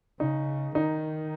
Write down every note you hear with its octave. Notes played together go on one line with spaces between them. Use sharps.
C#3 D#4
D#3 D#4